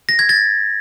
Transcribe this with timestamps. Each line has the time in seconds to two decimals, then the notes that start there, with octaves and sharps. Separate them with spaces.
0.09 A#6
0.19 G#6
0.29 A6